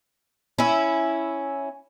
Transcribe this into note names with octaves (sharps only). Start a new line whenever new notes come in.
C#4 E4